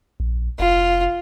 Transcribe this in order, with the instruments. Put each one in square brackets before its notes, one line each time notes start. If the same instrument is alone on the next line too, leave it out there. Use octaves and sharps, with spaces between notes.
[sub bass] A#1
[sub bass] F1 [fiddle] F4